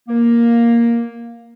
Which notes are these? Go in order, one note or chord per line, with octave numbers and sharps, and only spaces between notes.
A#3